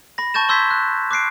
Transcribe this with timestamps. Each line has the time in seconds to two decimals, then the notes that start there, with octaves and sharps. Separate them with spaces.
0.18 B5 A#6
0.34 A5 C#6 G6 A6 E7
0.49 C6 E6 G6 G#6 B6
0.71 F#6
1.11 D6 F#6 C7 D7